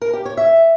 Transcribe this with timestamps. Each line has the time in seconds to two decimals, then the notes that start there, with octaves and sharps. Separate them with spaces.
0.01 A#4
0.13 G4
0.25 C#5
0.37 E5